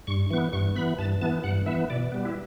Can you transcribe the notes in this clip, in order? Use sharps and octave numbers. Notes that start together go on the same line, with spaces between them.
G2 C#6
E3 B3 C#6
G2 C#6
E3 B3 B5
G2 A5
E3 B3 A5
G2 F#5
E3 B3 E5
B2 D5
G3 B3
E4